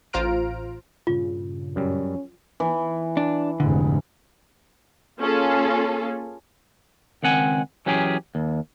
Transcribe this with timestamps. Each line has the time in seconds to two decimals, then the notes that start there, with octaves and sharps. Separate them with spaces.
0.13 A1 F4 C5 A#5 F6 D7
1.07 G2 A#2 C#3 F4
1.76 F#2 G3 C#4
2.60 E3
3.17 D4
3.60 F1 G#2 D3
5.20 A#3 C#4 F4 G#4 A4
7.23 C#2 D#3 C4 F#5 G#5
7.86 E3 F#3 C#4 G4 G#4
8.35 D#2